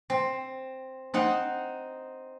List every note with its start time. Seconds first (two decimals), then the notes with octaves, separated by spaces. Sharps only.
0.10 C4
1.14 C4 D#4 F#5